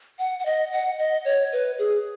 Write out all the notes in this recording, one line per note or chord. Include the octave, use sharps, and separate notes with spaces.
F#5
F#5
D#5
F#5
D#5
C#5
B4
G#4